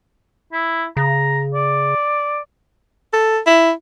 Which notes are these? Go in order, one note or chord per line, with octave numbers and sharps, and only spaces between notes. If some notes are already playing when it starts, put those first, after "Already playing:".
E4
C#3 A#5
D5
A4
E4